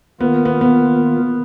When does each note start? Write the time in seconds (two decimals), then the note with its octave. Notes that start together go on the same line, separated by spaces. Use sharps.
0.21 D#3 A#3 B3 F4 A#4
0.45 B3
0.61 B3